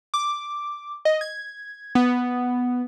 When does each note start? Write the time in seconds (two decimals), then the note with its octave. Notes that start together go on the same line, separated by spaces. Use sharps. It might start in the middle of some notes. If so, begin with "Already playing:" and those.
0.14 D6
1.05 D#5
1.21 G#6
1.95 B3